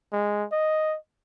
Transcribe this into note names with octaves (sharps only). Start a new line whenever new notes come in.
G#3
D#5